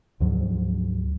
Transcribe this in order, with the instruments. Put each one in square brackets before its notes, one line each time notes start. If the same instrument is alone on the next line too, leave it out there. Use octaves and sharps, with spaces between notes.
[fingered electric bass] D2 G#2 F3 F#3